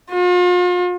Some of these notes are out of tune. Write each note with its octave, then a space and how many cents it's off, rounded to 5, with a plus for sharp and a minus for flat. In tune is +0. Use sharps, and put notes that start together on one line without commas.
F4 +40